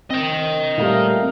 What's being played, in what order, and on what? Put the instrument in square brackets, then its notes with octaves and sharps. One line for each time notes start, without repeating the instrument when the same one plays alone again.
[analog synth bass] C4 [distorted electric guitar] D#5 G5
[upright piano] A#2 G3 [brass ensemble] A3 A#4 F5